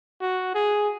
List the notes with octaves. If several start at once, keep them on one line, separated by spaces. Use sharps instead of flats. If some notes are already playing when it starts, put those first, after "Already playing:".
F#4
G#4